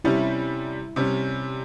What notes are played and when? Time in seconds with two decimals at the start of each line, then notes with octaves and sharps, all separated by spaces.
0.04 C3 G3 C#4 E4
0.96 C3 G3 C#4